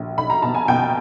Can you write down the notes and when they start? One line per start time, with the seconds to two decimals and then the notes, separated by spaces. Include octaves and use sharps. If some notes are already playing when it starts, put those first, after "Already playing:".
Already playing: A#1
0.18 B1 B5
0.30 A#5
0.42 B2 A5
0.55 G#5
0.68 B2 G5